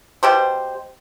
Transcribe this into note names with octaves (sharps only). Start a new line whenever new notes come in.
B2 G4 C5